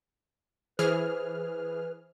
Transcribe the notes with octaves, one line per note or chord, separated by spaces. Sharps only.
E3 G#4 B4 C5 F6